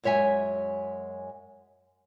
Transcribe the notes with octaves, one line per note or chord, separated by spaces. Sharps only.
F#2 G#3 C#5 E5 G#5